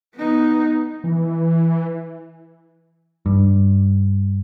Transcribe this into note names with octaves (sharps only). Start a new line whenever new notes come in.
B3 D#4
E3
G2